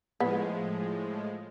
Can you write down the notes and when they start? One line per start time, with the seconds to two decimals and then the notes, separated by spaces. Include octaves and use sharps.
0.20 A2 F3 G#3 B3